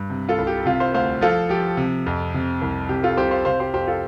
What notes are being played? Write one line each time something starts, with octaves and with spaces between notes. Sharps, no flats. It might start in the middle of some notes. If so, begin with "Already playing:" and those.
Already playing: G2
C3
F4 A4
C2
G4
C3 F4
C5 F5
D2 C5 F5
F3 F4 A4
F3 G4
C3
F2
C3
C2
C3 G4
F4 A4
C2 G4 C5
C5 F5
C3 C5 F5
G4 C5
F2 G4 C5
F4 A4